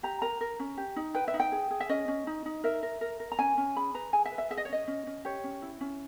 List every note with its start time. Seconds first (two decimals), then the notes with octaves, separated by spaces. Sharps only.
0.03 G4 A#5
0.22 A#4 A#5
0.41 A#4
0.60 C#4
0.78 G4
0.96 D#4
1.15 B4 G5
1.28 E5
1.34 D#4
1.40 G5
1.52 G#4
1.71 G#4
1.80 E5
1.89 C#4 D#5
2.08 C#4
2.27 D#4
2.46 D#4
2.64 A#4 E5
2.83 A#4
3.01 A#4
3.20 A#4
3.32 A#5
3.39 C#4 G#5
3.57 C#4
3.76 G#4 B5
3.94 B4 A#5
4.13 G#4 G#5
4.26 E5
4.32 B4
4.38 E5
4.50 G#4 E5
4.57 D#5
4.65 C#5
4.69 C#4 D#5
4.88 C#4
5.07 C#4
5.25 G4 C#5
5.44 C#4
5.62 E4
5.81 C#4